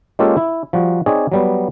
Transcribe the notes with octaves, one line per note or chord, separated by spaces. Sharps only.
G#3 A#3 C#4 F4 G4 A4
E4
F3 G3 F#4
C4 D#4 G#4 C#5 D5
F#3 G3 B3